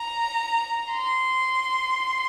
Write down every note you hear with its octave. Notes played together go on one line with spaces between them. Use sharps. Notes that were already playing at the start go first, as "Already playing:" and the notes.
Already playing: A#5
C6